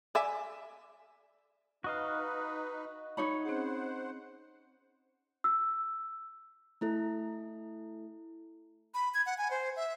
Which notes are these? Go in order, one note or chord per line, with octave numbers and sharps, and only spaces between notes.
D5 E5 G#5
D#4 F#4 B4 D#5 F5
D#4 C#5 B5
C4 C#4 G#4 C5 F#5
E6
A3 E4 A4
B5
G#6
F#5
G#5
C5
E5